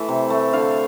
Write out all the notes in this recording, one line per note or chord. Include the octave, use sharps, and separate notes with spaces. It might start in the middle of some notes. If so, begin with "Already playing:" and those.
Already playing: E3 A3 E5
C3
A3
D3 F5